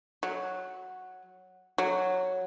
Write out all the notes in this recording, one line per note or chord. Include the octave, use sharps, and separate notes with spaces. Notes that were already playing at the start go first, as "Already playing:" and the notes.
F#3
F#3